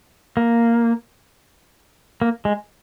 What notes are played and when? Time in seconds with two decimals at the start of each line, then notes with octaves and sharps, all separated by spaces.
0.37 A#3
2.22 A#3
2.45 G#3